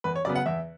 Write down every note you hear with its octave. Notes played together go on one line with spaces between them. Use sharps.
E2 B4
C#5
C#3 F#3 B3 D5
F#5
E2 E5